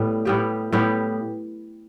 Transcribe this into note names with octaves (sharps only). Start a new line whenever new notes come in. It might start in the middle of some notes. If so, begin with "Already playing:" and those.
Already playing: A2 G3 B3
A2 G3 B3 G4
A2 G3 B3 G4